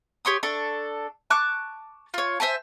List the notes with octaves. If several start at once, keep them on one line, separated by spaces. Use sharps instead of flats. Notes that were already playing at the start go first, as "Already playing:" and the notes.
G4 C#5 C6 D#6
D4 A4 C#6
A5 C#6 D6 F#6
F4 C#5
C5 E5 G#5 A5